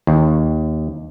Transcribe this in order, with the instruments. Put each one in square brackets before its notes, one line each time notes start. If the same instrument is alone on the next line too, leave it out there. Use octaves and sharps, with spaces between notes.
[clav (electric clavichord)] D#2